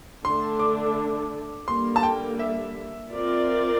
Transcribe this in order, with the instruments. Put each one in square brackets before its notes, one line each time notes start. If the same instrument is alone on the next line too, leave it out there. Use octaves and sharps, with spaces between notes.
[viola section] D3 A3 D4 A4 [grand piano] C6
[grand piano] D6
[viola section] D3 G3 A#3 [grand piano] C6
[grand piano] A5
G5
E5
[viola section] C4 F4 A#4 D5